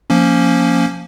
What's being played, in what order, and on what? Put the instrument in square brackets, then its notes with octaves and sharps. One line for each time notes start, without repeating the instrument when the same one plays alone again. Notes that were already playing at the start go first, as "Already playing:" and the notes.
[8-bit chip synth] F3 A#3 C#4